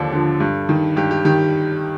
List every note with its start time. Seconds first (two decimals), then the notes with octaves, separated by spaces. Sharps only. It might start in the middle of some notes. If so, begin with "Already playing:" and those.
Already playing: D#2 D3 F3 D4 A4
0.12 D3 F3
0.40 G2
0.69 D#3
0.96 G2 G4
1.11 G4
1.25 D#3 G4